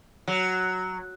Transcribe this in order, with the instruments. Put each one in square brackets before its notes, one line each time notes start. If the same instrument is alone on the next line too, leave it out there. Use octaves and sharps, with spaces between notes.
[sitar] F#3